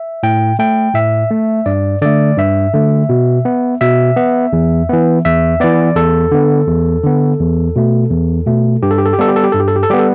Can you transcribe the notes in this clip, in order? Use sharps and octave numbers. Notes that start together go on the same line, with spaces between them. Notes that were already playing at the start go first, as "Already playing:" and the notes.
Already playing: E5
A2 G5
A3 G5
A2 E5
A3
G2 D5
D3 A3 D5
G2 E5
D3 A3
B2
B3
B2 E5
B3
E2
E3 B3
E2 E5
E3 B3 D5
E2 A4
D3 B3
E2
D3 B3
E2
B2 A3
E2
B2 A3
G2 G4
A4
G4
A4
G4
G3 B3 A4
G4
A4
G4
G2 A4
G4
A4
G4
A4
G3 B3 G4
A4